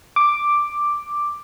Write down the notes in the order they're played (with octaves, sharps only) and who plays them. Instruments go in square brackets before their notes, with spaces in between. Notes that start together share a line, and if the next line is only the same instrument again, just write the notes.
[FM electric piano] D6